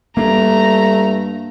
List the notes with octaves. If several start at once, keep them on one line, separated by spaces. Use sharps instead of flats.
G2 A3 A#3 D4 A#5